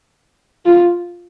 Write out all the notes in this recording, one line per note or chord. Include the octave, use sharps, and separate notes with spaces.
F4